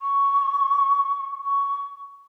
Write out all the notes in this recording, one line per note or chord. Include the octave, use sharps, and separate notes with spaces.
C#6
C#6